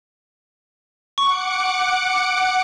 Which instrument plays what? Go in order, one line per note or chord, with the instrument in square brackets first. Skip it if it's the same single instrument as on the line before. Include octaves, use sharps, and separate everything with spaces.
[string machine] F#5 D6 C#7 [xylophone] C#6